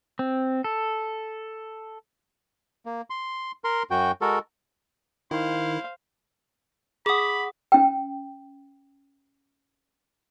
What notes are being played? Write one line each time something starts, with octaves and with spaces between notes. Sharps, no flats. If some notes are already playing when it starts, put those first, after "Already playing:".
C4
A4
A#3
C6
A#4 C6
F#2 F#4 G5
G#3 F#4 A4 A#4
D#3 E4 C5 F5
G#4 F#5 B5 D6 D#6
C#4 G5